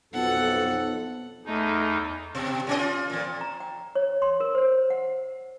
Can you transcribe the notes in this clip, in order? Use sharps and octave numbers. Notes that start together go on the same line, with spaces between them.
B1 F2 B3 A4 F#5
E2 A3 D#4 D#5
B2
A#2 C#4 D#5
F4
F2 A#2
A#5
G5
C#5
C6
A#4
C5
F#5